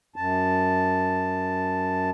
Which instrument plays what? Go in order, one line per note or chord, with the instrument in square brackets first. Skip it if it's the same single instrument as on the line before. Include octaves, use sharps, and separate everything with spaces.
[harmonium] F#2 A5